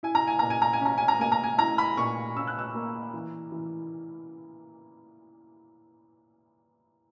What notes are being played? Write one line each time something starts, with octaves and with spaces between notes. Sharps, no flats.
E4 G#5
A#5
G#5
A#2 A#5
G#5
A#5
G#5
C#4 A#5
G#5
A#5
A#3 G#5
A#5
G#5
E4 A#5
B5
A#2 C#6
C#4 E6
F#6
E6
A#3
E3
E3